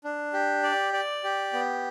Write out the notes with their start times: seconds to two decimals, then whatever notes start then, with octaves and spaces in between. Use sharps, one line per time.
0.04 D4
0.33 G4
0.63 D5
0.93 D5
1.24 G4
1.53 B3